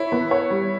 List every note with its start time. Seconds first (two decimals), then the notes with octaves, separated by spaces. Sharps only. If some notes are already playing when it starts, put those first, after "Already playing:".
Already playing: E4 C#5
0.12 B3
0.31 C#5
0.51 G3